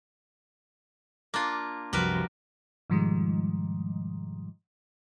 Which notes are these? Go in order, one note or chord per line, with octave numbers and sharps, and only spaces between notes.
A#3 D4 F4
C2 F#2 F3 G3 F#4 A#4 B4
G#2 B2 D#3 F3 G3 G#3